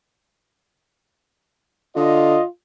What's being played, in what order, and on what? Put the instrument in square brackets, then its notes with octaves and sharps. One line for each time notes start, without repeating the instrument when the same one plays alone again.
[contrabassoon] D3 [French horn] F4 [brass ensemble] D#5